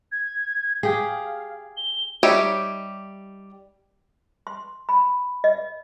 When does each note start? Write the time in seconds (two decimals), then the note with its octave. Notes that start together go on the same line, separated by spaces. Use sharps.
0.12 G#6
0.83 G4 G#4 F5
1.77 G7
2.23 G3 D#4 G4 C#5 E5
4.47 C6
4.89 B5
5.44 D#5